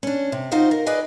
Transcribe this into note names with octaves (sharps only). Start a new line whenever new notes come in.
C#4 D4
C3
D#4 F4 F#4 C5 D#5
A#4
G#4 B4 D5 D#5 G#5